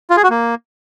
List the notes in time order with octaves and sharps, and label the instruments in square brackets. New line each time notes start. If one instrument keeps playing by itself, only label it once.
[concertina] F4
G#4
F#4
A#3